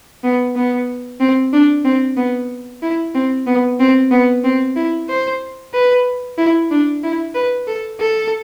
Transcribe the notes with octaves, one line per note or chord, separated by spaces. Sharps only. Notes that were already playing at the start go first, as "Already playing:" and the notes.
B3
B3
C4
D4
C4
B3
E4
C4
B3
C4
B3
C4
E4
C5
B4
E4
D4
E4
B4
A4
A4